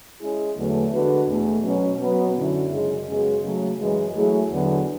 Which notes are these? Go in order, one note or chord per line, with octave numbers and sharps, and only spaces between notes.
G#3 C#4 E4 G#4
E2 D3 F#3 A3
D3 G#3 B3 F#4 B4
E2 B2 A3
B2 F#3 C#4
B2 F#3 B3
F#2 D3 F#3 C#4 E4
F#2 C#3 G#3
F#2 C#3 G#3 B3 F#4
C#3 F#3 A3
F#2 E3 G#3
F#3 A3 E4 G#4
E2 D3 F#3 B3